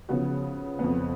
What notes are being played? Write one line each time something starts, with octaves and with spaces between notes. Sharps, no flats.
C#3 F3 B3 F#4
F2 F3 B3